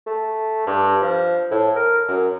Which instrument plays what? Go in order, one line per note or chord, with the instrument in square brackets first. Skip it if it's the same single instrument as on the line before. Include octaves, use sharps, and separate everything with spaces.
[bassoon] A3
G2
F3
A2
A#4
F#2